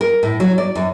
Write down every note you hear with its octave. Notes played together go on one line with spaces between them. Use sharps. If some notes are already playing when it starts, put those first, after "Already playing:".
A#4
A2
F#3
D5
F#2